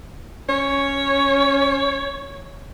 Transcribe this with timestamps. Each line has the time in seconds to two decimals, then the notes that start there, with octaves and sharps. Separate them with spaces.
0.49 C#4 C#5